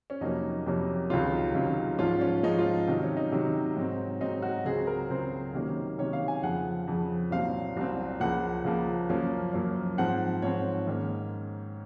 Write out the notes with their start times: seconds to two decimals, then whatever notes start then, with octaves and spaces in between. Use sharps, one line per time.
0.10 C#4
0.21 F2 C3 F#3 A#3 C#4 D#4
0.66 F2 C3 F#3 A#3 C#4
1.10 C#2 C3 D#3 F#3 C#4 F4
1.54 C#2 C3 D#3 F#3 C#4
1.98 G#2 F3 G#3 C#4 F4
2.21 C#4
2.43 G#2 F3 G#3 C#4 D#4
2.59 F4
2.87 C3 D#3 F#3
3.03 C#4
3.17 D#4
3.31 C3 D#3 F#3 D#4
3.76 G#2 F#3 C4
4.21 G#2 F#3 C4 D#4
4.42 F#4
4.65 C#2 C#3 F#3 C4 G#4
4.87 A#4
5.10 C#2 C#3 F#3 C4 C5
5.53 C3 D#3 F#3 A#3 C#4
5.98 C3 D#3 F#3 A#3 C#4 C#5
6.13 F5
6.28 G#5
6.43 F2 C#3 F3 F#5
6.87 F2 C#3 F3
7.31 C2 A#2 F#3 C4 F5
7.77 C2 A#2 F#3 C4
8.20 C#2 C#3 F3 A#3 F#5
8.64 C#2 C#3 F3 A#3
9.09 F#2 F3 A#3 C#4
9.53 F#2 F3 A#3 C#4
9.98 G#2 F3 C4 F#5
10.42 G#2 F3 C4 C#5
10.87 G#2 D#3 A#3 C#4